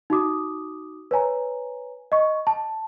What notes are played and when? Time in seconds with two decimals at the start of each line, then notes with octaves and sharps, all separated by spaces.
0.10 D#4 F#4 D6 D#6
1.11 B4 C#5 G#5 A#5
2.12 D#5 C#6
2.47 A5